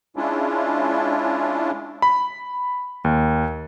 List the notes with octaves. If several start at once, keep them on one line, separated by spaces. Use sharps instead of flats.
G#3 C#4 D4 E4 F4
B5
D#2